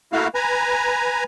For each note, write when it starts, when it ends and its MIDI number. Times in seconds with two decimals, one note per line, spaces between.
0.13 0.28 57
0.13 0.28 58
0.13 0.28 64
0.13 0.28 66
0.13 0.28 77
0.35 1.24 71
0.35 1.24 80
0.35 1.24 82